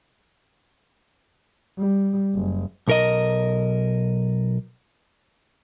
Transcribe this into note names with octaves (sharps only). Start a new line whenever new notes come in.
G3
F#1
B1 A#4 D#5